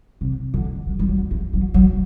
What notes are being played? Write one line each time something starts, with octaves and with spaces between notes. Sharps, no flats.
C3
D3
F#3
G3
F#3
E3
F#3
F#3